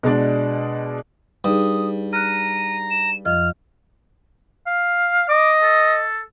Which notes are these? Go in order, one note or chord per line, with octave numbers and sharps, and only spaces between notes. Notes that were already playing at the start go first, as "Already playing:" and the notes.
B2 G#3 D4 D5
G2 D#4 G#4 D#6
A#5 F6 F#6 D#7
E7
F2 F3 D#5 F6
F5
D#5 D6
A4